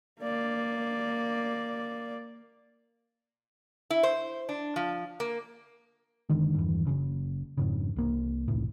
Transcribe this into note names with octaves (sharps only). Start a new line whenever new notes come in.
A#3 D5
E4
C5
D4
F3
A#3
F#1 D3 D#3 G#3
E2 G2
F#1 C#3
F2 G#2 C#3
C2 A#3
E1 C2 A2